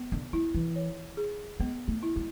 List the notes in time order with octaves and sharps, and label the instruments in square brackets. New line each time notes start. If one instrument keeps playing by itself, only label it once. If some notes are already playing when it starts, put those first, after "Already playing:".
Already playing: [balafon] B3
[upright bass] D3
[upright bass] G#3 [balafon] E4
[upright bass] E3
[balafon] C#5
G#4
[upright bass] G#3 [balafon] B3
[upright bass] A3
[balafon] E4
[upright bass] G#3